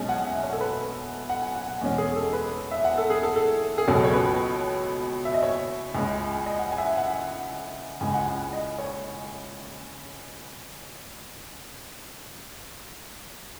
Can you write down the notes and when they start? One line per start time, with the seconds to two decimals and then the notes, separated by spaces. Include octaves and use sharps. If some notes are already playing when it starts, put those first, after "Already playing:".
Already playing: B1 B2 G#3 C#4 G#5
0.09 F#5
0.26 E5
0.43 C#5
0.53 A4
0.61 B4
1.29 F#5
1.42 G#5
1.55 F#5
1.68 F#5
1.81 E2 B2 G#3 C#4 D#5
1.98 G#4
2.16 A4
2.33 B4
2.71 E5
2.84 F#5
2.98 A4
3.10 G#4
3.23 A4
3.36 A4
3.78 G#4
3.88 C#2 B2 F#3 C#4 A4
4.04 C#5
4.14 B4
5.25 E5
5.34 D#5
5.43 C#5
5.95 C#2 C#3 G#3
6.46 D#5
6.59 F#5
6.72 G#5
6.78 E5
6.85 F#5
6.98 F#5
8.01 C#2 C#3 G#3 G#5
8.14 F#5
8.27 F#5
8.53 D#5
8.78 C#5